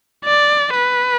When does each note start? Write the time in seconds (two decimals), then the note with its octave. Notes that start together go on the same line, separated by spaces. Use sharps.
0.25 D5
0.75 B4